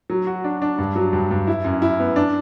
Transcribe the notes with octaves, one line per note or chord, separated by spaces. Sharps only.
F#3
F#4
D4
D4
G2
F#3
G2
G2
E4
F#2
E4
B3
D4